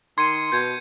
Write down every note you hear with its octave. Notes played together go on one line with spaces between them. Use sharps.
D#3 C6 G#6 C#7 D#7
B2 G6 G#6